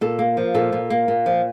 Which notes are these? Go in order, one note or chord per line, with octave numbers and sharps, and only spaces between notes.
A#2 A4
A#3
F3
A#2 A4
A#2
A#3
A#2
F3